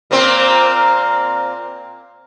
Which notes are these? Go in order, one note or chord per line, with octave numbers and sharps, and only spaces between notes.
A#2 A#3 C4